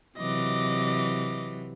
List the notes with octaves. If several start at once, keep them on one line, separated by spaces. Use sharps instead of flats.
C3 E3 F#3 D#5 D6